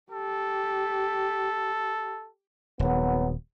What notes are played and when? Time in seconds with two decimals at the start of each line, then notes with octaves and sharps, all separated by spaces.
0.12 G4 A4
2.79 D#1 G#1 F#3 B3